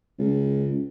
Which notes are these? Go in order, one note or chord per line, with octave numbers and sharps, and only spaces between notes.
C#2